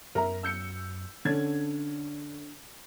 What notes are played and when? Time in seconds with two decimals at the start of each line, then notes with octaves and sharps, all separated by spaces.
0.15 F#2 C#4 A#4 E5 A#5
0.43 E6 G6 C#7
1.25 D3 C#4 D4 G#6